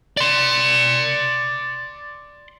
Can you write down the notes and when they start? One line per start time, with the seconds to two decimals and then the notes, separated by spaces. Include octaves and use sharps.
0.17 D5 C6